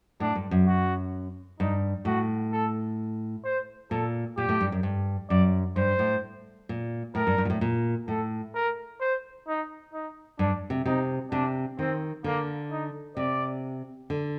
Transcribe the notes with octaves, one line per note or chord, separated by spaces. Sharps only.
A2 D4
G2
F#2
F#4
G2 D#4
A2 F#4
A4
C5
A#2 A4
A#2 G4
A2
G2
F#2
G2
F#2 D5
G2 C5
A2
A#2
A2 A#4
G2
G2
A#2
A2
A#2
A2 A4
A#4
C5
D#4
D#4
G2 D4
C3
C3 D#4
C3 D4
D#3 C4
D3 A#3
D#4
C3 D5
D3